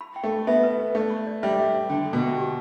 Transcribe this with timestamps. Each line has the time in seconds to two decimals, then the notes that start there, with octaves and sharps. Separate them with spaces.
0.01 B5
0.16 G5
0.23 A3
0.32 B5
0.47 B3 E5
0.63 B4
0.80 B4
0.95 A3 D5
1.11 B5
1.27 D5
1.42 G3 E5
1.59 E5
1.74 B4
1.90 D3 G5
2.05 A4
2.13 B2
2.22 G5
2.37 G4